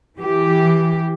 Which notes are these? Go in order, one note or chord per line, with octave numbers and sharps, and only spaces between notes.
E3 G4